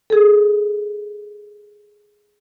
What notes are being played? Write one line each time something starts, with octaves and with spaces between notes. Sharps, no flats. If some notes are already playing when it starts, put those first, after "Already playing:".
G#4 A4